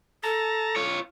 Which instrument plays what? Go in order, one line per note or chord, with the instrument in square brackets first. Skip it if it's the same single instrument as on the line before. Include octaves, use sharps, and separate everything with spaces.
[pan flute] A4 [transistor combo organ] A5 A#5
[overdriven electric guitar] F4 C#5